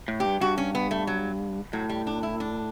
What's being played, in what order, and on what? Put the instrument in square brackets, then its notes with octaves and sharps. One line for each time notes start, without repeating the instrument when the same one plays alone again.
[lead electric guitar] A2
[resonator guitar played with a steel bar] G4
[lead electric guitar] G2
[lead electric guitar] G2 [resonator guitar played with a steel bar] F#4
[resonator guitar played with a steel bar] C#4
B3
A3
F#3
[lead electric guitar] A2 [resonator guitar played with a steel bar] F#3
[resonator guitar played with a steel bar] G3
D4
E4
D4